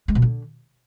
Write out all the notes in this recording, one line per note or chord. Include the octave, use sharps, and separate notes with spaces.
G#3
B2
D3